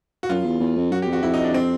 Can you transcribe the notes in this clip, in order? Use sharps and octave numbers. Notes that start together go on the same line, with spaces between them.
F#4
F#2 F4
E2
E2
F2
F#2 F#4
G4
F2 F#4
F2 E4
D#4
D4
C4